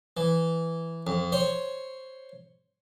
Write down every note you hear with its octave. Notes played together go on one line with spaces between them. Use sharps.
E3
F2
C5 C#5